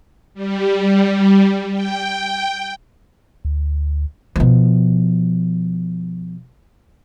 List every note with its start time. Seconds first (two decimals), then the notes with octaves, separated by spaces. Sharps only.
0.34 G3
1.72 G5
3.45 D2
4.36 B2 F3